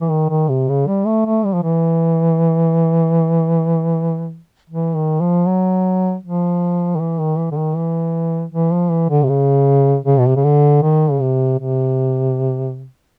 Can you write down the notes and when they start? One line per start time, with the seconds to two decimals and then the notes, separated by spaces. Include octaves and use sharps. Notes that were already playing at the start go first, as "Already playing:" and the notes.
0.01 E3
0.10 D#3
0.29 D#3
0.49 C3
0.69 C#3
0.87 G3
1.06 A3
1.26 A3
1.45 G3
1.54 F3
1.63 E3
4.70 E3
4.95 D#3
5.20 F3
5.47 F#3
6.23 F3
6.95 D#3
7.00 E3
7.19 D#3
7.38 E3
7.51 D3
7.57 D#3
7.76 E3
8.52 E3
8.72 F3
8.91 E3
9.10 D3
9.23 C3
9.29 C#3
10.05 C#3
10.19 B2
10.28 C3
10.36 C#3
10.44 D3
10.82 D#3
11.11 C#3
11.21 C3
11.59 C3